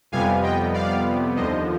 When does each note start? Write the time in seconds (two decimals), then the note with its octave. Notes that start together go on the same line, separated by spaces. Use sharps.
0.12 F2 C3 G3 B3 F5 G#5
0.43 D#5 G5
0.74 D5 F5
1.36 D#2 D3 F3 C5 D#5